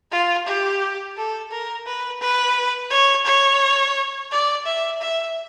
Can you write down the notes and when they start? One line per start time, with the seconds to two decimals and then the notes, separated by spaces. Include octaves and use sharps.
0.12 F4
0.47 G4
1.17 A4
1.51 A#4
1.86 B4
2.20 B4
2.90 C#5
3.25 C#5
4.31 D5
4.65 E5
5.01 E5